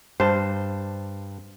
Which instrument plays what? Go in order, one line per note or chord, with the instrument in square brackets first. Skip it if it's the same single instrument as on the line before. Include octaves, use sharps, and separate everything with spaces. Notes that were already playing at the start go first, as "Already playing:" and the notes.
[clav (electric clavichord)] G2 A5 [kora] C5